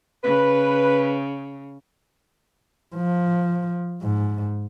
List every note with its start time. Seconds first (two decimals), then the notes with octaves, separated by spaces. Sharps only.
0.24 C#3 B4
2.95 F3
4.02 G#2